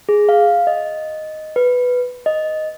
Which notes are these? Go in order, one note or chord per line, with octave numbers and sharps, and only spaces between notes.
G#4
F5
D#5
B4
D#5